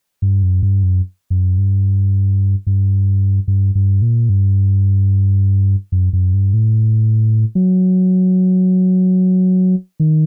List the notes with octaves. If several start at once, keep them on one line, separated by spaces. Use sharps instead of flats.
G2
F#2
G2
F#2
F#2
G2
G2
G2
G2
A#2
G2
F#2
F#2
G2
A2
F#3
D#3